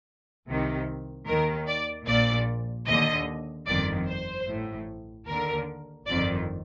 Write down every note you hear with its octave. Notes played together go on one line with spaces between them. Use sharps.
C2 C3 D#3
D#2 D#3 A#4
D5
A#1 A#2 D5
D#2 D3 D#5
G1 F2 D#3 D5
C5
A1 A2
D#2 D3 A#4
G1 F2 D#3 D5